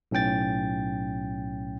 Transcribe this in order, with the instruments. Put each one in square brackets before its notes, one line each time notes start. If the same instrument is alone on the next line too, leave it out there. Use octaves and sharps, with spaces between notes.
[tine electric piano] B1 A2 C#4 G5 A6